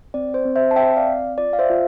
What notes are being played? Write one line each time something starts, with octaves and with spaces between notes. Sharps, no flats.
C4 D5
C5
C4
C5 E5
A5
C4 E5 G5
D5 F5
C4
F4 D5
F5
C5 E5
F4